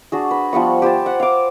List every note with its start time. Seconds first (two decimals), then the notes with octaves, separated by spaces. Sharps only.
0.12 D4 F#4 G#4
0.31 B4
0.53 F3 G3 B3 C#6
0.82 G4 C5 G#5 A5
1.06 F#5
1.20 F5 D6